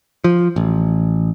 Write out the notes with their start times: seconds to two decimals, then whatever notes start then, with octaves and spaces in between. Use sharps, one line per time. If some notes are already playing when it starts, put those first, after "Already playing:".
0.24 F3
0.56 A1